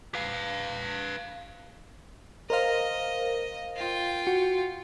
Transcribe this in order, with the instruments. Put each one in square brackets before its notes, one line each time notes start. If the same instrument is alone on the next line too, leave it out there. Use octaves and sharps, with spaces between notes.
[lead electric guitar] B4 F5
[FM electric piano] A#4 C5 F5 [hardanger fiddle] D#5
[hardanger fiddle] F4 G5
[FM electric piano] F#4